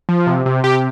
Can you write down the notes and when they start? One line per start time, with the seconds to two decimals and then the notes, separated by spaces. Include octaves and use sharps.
0.09 F3
0.27 C3
0.46 C3
0.64 C3 G4